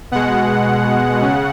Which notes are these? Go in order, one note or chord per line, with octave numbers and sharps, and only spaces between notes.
B2 G#3 F#5
C#3